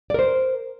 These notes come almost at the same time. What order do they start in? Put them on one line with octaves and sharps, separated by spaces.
D5 A#4 C5